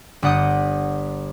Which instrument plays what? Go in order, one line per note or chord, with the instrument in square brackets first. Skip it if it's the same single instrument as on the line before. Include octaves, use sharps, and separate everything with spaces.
[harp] G1 D5 F#5 D#6 G6